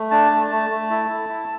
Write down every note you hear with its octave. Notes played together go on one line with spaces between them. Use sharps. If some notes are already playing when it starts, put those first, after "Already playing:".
Already playing: A3
D4 A5
A3
A3
A3
E4
E4
E4